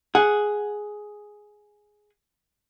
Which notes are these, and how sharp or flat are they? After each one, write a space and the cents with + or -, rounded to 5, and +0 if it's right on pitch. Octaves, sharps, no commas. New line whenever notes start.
G#4 +5 F#5 +0